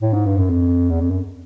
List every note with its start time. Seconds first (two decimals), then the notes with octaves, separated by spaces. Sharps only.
0.01 A2
0.14 G#2
0.26 G2
0.38 F#2
0.50 F2
0.90 E2
1.01 F2
1.11 F#2